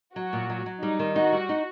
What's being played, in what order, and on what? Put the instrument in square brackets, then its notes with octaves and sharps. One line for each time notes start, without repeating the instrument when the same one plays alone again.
[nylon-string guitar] F#3 [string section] F#4
[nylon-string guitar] A#2
F#3
F#3
[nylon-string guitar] G3 [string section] D#4
[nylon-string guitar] D#3
[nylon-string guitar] D#4 [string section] F#4
[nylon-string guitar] G3
D#4